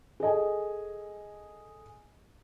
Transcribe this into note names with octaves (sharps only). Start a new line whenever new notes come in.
G#4 A4 D#5 G#5